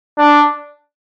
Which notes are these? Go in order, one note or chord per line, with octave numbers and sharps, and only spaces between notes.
D4